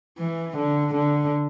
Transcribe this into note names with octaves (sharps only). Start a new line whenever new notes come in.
E3
D3
D3